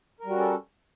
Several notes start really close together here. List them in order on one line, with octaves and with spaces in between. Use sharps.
A#4 G3 F#4 C#4 A4